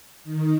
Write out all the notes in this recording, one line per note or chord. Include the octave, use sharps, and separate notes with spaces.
D#3